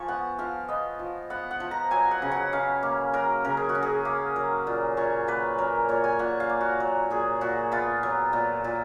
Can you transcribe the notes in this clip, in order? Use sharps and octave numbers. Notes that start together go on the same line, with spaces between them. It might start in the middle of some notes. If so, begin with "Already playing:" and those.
Already playing: F3 G#5 C#6
B3 F#5
F3 F5
B3 D#5
F3
B3 F#5
F#5
F3
A#5
F#3 G#5
F#5
C#3
F#5
C#4 F5
A#3
F#3 A#4
C#3 A#4
G#4
F#4
C#4
G#4
A#3
F#3
A#2
A#2 C#5
A#3 B4
F#3 A#4
A#2 C#5
G#5
A#2 F#5
F5
A#3
F#4
F#3
A#2 G#4
A#2 F#4
B3 F4
F#3
A#2
A#2